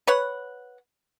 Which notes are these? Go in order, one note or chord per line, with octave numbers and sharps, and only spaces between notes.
B4 C#5 F#5